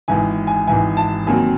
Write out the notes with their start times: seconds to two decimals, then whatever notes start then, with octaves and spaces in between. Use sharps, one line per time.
0.08 G#1 G#2 E3 G#5
0.47 G#5
0.67 G#1 G#2 E3 G#5
0.97 A5
1.27 D#2 D#3 F#3 C4 G#5